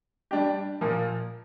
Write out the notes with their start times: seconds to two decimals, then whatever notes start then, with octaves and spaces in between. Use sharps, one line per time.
0.31 G3 D4 G4
0.81 A#2 F3 A#3